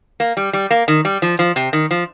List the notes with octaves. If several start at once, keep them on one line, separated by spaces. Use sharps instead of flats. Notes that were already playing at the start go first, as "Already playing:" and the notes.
A#3
G3
G3
A#3
D#3
G3
F3
F3
C3
D#3
F3